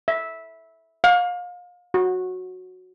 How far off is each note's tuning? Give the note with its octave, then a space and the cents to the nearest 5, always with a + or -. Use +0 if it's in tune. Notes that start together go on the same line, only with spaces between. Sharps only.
E5 -10
F5 +30
F#4 -10